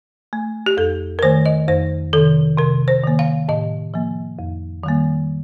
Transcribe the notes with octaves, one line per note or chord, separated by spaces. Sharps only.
A3
G4
F2 A4
A#4
D#3 A3 C5
D#5
F2 C5
C3 D#3 A4
C3 A#4
C5
D#3 A#3
F5
A2 D#5
F3 A#3
F2
D#3 G3 A#3